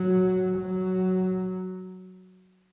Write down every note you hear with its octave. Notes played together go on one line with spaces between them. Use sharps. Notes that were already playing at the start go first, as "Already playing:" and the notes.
Already playing: F#3
F#3